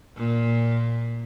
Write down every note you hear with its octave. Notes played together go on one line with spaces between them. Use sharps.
A#2